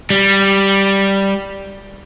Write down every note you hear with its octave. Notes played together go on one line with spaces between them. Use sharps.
G3